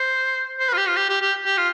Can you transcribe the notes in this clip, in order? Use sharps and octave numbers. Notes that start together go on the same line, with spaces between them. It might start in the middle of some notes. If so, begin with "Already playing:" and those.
Already playing: C5
C5
B4
F4
G4
F4
G4
G4
G4
G4
F4